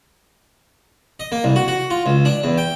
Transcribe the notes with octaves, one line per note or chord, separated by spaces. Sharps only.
D#5
A#3
C2
F#4
F#4
F4
C#2
D4
E2
G5